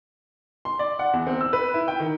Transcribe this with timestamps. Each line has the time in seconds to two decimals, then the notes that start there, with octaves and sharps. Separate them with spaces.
0.65 C6
0.79 D5
0.99 F#5
1.13 E2
1.27 C4
1.41 E6
1.53 B4
1.74 E4
1.88 G5
2.00 D#3